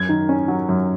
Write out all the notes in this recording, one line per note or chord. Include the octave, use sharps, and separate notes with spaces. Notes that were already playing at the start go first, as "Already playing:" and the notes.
Already playing: F#2 G#6
D#3
C#4
F#3
F#2